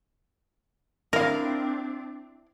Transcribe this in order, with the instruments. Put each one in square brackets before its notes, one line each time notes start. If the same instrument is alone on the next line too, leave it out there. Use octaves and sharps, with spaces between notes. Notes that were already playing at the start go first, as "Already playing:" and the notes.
[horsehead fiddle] C4 D4 [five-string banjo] E4 F5 [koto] A#4